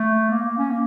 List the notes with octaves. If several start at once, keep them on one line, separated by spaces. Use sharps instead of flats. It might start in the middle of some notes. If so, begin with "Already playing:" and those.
Already playing: A3
A#3
A#3
C#4
A#3